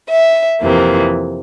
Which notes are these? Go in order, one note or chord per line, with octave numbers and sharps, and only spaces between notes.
E5
F2 C3 E3 A#3